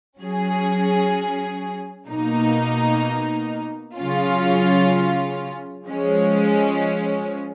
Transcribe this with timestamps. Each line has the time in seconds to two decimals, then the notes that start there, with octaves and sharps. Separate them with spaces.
0.20 F#3 C#4 G#4
2.09 B2 A#3 D#4
3.98 C#3 F#3 C#4 F4
5.85 F3 G#3 C#4